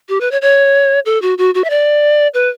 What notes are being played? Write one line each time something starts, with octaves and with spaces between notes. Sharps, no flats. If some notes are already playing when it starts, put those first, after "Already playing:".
G4
B4
C#5
C#5
A4
F#4
F#4
F#4
E5
D5
B4